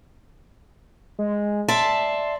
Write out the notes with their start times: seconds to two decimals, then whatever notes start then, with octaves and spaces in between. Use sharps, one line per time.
1.19 G#3
1.68 D5 E5 A5 C6